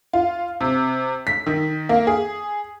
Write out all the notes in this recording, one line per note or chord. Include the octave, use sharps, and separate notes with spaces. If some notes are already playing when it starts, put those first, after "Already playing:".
F4
C3
B6
D#3
A#3
G#4